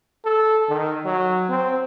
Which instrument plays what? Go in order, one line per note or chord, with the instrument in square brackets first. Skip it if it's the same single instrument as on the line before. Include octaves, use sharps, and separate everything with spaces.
[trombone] A4
D#3
F#3
C4